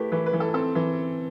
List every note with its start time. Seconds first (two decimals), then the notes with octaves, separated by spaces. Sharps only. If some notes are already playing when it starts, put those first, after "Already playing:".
Already playing: A3 E4 G4 B4
0.12 E3 B4
0.26 B4
0.33 E3
0.40 A4
0.54 C4 A4
0.75 E3